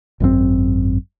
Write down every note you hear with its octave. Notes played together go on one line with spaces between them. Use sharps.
G#1 F#2 B2 C4